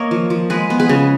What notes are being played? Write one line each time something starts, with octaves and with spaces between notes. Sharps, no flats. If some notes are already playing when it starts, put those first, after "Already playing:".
Already playing: A#3 A#4 C#5 D#5
F3
F3
G#3 G#4 B4
B3
G#4 B4
C#3